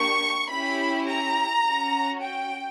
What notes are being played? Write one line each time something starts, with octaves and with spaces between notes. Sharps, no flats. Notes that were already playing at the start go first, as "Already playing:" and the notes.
Already playing: A#3 D4 G4 C#6
C#4 E4 G4 B5
A#5
C#4 F#4
G5